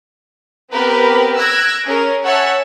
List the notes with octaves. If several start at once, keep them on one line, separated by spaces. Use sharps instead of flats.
B3 C4 G4 A#4 B4
E6 F#6 G#6 A#6 D7
C#4 G#4 A#4
C#5 E5 F#5 G#5 A5 E6